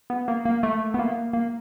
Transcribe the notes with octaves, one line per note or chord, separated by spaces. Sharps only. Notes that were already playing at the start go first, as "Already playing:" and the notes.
B3
A#3
A#3
A3
B3
A#3
A#3